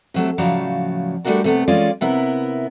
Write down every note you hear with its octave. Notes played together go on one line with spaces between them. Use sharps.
C3 F#3 A3
A2 C#3 F3 F#3 D5
G3 A3 C4 D4 F#4 A#4
C3 A3 B3
E3 G#3 C#4 F4 D5
C3 B3 E4 A#4